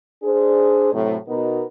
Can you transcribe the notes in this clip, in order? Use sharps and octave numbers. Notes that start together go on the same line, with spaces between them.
D4 G#4 C5
A2 C3 F#3
B2 B3 D#4 F#4 A#4 B4